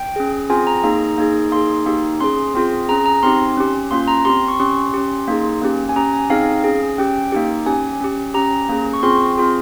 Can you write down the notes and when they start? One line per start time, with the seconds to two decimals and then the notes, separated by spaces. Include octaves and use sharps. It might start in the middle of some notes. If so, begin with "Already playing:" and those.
Already playing: G5
0.16 C#4 G#4
0.50 C4 F4 G#4 G#5
0.67 A#5
0.84 A#3 D#4 G#4
1.18 A#3 D#4 G#4
1.52 A#3 D#4 G#4 C6
1.86 A#3 D#4 G4
2.21 C#4 G#4 C6
2.55 C4 F4 G#4
2.89 C#4 G#4 A#5
3.06 A#5
3.23 C4 D#4 G4 C6
3.57 C#4 G4
3.91 A#3 C#4 F4 C6
4.08 A#5
4.25 C4 G4 C6
4.48 C#6
4.60 C#4 G4 C6
4.94 C#4 G4
5.28 A#3 D#4 G#4
5.61 A#3 C#4 G4
5.89 G#5
5.96 C#4 G4 A#5
6.13 G#5
6.30 C4 D#4 G#4 F5
6.64 C#4 G#4
6.98 C#4 G4 G5
7.32 A#3 D#4 G4
7.66 C#4 G4 G#5
8.01 C#4 G4
8.34 C#4 G4 A#5
8.69 A#3 C#4 G#4
8.93 C#6
9.03 C4 F4 G#4 C6
9.37 C4 F4 G#4